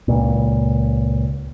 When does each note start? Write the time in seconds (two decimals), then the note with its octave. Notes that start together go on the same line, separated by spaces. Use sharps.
0.08 C#2 A#2